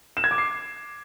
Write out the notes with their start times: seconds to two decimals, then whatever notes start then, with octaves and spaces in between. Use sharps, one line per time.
0.17 E7
0.24 G#6
0.31 D6
0.38 C7